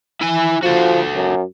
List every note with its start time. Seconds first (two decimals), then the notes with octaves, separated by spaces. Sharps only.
0.21 E4 G#5
0.63 F3 F#4 A4
1.15 F#2